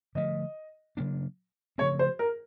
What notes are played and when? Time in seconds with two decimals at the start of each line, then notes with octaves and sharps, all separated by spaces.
0.15 D3 F3 A3 D#5
0.97 C#3 F#3 A#3 D4
1.78 C#3 F3 A3 C4 C#5
1.99 C5
2.19 A#4